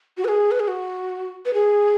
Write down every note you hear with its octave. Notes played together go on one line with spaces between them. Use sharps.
F#4
B4
G#4
B4
G#4
F#4
B4
G#4